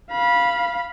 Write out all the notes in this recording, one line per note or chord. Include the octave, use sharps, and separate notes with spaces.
F5 B5